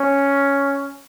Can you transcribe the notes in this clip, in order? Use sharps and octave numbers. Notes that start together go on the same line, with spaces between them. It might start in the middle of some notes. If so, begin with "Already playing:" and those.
Already playing: C#4